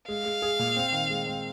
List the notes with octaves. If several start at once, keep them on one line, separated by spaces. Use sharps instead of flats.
G#3 F5
G#3
G#4
A#2
C4
D#3
G#3
C4